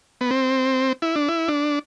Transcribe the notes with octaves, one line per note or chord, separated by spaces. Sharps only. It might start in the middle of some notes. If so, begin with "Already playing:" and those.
B3
C4
E4
D4
E4
D4